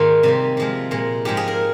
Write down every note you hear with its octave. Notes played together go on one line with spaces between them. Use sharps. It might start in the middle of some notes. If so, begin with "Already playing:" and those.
Already playing: G#2 D#3 A#3 F4
C3 G3 A#3
C3 F3 G#3
A#2 G#3
G#2 F3 G#3 G4
G#4
A#4